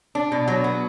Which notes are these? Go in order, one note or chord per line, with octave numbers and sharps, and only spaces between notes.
D4
B2
F#3
B3